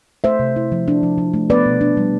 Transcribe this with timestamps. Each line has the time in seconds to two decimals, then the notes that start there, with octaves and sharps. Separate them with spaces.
0.24 A3 C5 E5
0.39 C3
0.56 E4
0.72 F3
0.88 D4
1.03 F3
1.18 F3
1.34 A3
1.50 B3 B4 D5
1.66 B2
1.81 D4
1.97 G3